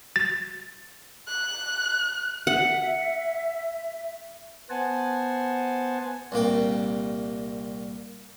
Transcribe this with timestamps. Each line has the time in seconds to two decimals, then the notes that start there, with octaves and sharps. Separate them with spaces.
0.16 A6
1.28 F#6
2.47 E5 F#5
4.70 B3 C5 F#5 G#5 A5
6.32 C2 A#2 A#3 G5